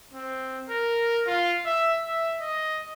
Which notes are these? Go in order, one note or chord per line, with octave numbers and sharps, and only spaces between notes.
C4
A#4
F4
E5
E5
D#5